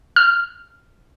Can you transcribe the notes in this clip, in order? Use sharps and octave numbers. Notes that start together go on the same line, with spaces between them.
F6